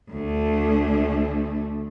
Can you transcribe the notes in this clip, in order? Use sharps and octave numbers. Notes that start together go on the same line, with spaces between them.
D2 A3